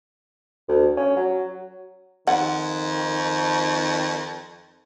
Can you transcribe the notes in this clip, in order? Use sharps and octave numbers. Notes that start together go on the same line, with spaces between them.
D2
C#4
F#3
F2 D#3 F#5